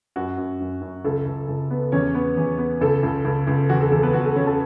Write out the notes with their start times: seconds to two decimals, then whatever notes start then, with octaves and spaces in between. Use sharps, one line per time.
0.16 F#2 F#4
0.37 F#2
0.60 F#2
0.81 F#2
1.04 C#2 A4
1.26 C#2
1.48 C#2
1.70 B3
1.92 E2 C#4 C#5
2.14 B3
2.37 E2
2.58 B3
2.81 C#2 A4
3.03 C#2
3.25 C#2
3.47 C#2
3.69 E2 F#4
3.81 A4
3.91 E2 A4
4.03 B3 B4
4.13 E2 F#4
4.25 A4
4.35 E2 C#4 C#5
4.46 A4 A5